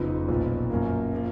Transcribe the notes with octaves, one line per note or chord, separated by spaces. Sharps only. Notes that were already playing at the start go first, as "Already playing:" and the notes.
Already playing: F#1 F2 F3 B3 D#4
B1 A#2 F3 B3
F#2 F3 A#3
F3 A#3